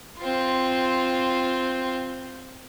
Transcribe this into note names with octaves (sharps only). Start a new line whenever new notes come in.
C4 F4